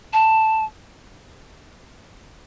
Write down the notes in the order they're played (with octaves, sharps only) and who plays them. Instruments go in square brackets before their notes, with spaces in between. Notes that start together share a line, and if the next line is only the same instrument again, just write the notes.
[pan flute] A5